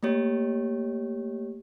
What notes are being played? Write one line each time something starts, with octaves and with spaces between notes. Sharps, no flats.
A3 A#3 G4 C#5